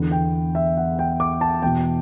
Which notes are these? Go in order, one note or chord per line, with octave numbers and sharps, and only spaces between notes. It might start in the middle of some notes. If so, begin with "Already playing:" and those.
Already playing: E2 D3
G5
E5
F#5
G5
D6
A5
E2 B2 G5